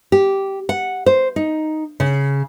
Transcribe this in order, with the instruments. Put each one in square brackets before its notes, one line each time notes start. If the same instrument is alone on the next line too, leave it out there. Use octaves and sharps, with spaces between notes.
[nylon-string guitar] G4
F#5
C5
D#4
C#3